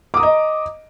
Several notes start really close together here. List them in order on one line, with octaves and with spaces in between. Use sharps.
D6 D#6 A#5 D#5